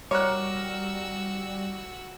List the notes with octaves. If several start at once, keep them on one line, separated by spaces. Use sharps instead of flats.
G3 F#4 A#4 C#5 D6 E6 F#6